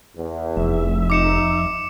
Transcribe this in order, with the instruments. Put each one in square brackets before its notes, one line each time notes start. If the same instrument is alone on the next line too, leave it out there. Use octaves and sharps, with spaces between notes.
[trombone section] E2
[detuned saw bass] F1 [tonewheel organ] F2 E5
[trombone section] D#4 [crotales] D6 C#7 E7